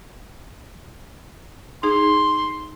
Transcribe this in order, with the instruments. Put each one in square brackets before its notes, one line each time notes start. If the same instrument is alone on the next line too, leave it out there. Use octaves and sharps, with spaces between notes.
[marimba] D#4 G#4 [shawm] C6